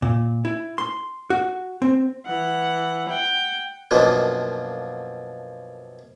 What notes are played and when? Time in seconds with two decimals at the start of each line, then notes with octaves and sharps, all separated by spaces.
0.02 A#2
0.45 E4
0.78 C6
1.30 F#4
1.82 C4
2.26 E3 F#5
3.09 F#5 G5
3.91 F#2 B2 F3 A#3 D4 D#5